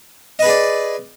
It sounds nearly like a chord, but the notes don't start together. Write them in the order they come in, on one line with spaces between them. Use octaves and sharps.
D#5 B4 G#4 D5